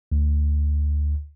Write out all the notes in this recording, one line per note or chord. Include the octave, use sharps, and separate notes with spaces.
D2